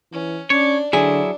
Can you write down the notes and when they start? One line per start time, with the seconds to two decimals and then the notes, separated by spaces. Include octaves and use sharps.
0.13 E3 C#4
0.50 C#4 D4 C#5 D5
0.93 D3 F#3 D4 E4 G#4